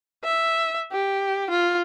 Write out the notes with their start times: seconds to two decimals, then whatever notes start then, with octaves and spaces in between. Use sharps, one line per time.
0.24 E5
0.92 G4
1.50 F4